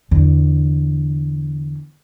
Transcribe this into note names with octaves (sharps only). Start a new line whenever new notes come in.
E2 D3